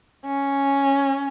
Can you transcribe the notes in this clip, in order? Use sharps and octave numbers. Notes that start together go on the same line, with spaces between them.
C#4